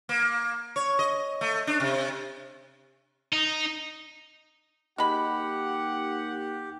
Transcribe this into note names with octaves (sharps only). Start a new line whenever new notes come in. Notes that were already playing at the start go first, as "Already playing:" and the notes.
A#3
C#5
D#5
A3
D4
C3
D#4
D#2 G#3 G4 F#5 B5